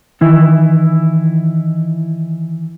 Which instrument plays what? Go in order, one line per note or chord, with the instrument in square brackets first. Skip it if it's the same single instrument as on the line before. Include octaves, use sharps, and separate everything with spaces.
[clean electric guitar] D#3 E3 E4